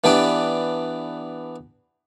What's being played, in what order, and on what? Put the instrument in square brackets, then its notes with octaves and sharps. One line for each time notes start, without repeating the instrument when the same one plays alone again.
[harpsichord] E3 B3 D4 G4 D5